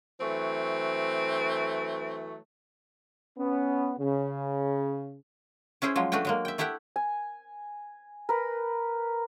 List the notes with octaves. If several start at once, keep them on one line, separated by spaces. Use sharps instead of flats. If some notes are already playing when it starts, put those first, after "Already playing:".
E3 F#3 A3 C4
B3 C#4
C#3
C#4 E4 G#4 C5
F3 F#3 G#3
A3 D4 F#4 B4 G5
F#3 G#3 A#3
E5 G5
A3 E4 G4 E5 F#5 G5
G#5
A#4 B4